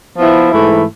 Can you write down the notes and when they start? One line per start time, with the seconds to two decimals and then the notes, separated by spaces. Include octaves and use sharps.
0.17 F3 B3 E4
0.52 G#2 E3 A3 E4